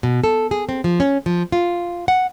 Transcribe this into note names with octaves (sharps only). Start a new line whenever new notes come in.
B2
A4
G#4
C4
F3
C#4
F3
F4
F#5